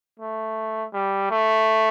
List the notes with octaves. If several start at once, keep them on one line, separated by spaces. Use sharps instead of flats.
A3
G3
A3